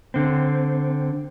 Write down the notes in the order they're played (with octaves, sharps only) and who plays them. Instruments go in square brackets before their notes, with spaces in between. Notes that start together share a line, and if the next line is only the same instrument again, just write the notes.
[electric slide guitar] D3 C4